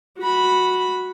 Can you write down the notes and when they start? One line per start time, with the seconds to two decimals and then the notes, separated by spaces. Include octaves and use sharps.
0.19 F#4 B5